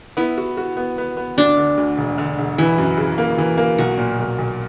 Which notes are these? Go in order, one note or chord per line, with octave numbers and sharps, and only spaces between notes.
B3 E4
F#4
F#4
B3
B3
B3
D2 D4
D3
D2
E1
D3
E1
E3 E4
F#2
C#3
A#3
E3
A#3
B1 F#4
A#2
B1
B1